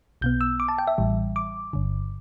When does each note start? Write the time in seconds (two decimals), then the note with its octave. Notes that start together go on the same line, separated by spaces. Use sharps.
0.21 B1 B2 B3 G6
0.41 E6
0.60 D6
0.68 A5
0.78 G5
0.87 E5
0.98 A1 A2 E3 G3
1.36 D6
1.73 G1 G2 D3